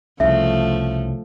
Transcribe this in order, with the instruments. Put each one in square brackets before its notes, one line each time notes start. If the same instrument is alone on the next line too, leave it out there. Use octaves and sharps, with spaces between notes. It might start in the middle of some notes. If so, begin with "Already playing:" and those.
[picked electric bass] C2 C#3 [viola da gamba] F3 A3 [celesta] E5